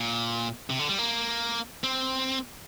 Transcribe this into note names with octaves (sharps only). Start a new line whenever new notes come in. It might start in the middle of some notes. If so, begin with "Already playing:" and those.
Already playing: A#2
C3
D3
G3
A#3
C4